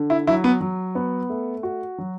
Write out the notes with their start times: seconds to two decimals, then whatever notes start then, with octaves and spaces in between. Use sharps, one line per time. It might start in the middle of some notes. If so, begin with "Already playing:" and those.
Already playing: D3
0.10 E4
0.27 F#3 E4
0.44 B3
0.61 F#3
0.95 B3
1.29 A3
1.63 F#4
1.98 F#3